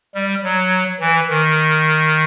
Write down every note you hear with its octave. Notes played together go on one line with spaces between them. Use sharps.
G3
F#3
E3
D#3